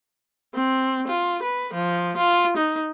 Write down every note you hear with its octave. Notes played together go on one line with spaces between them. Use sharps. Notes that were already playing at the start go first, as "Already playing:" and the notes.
C4
F4
B4
F3
F4
D#4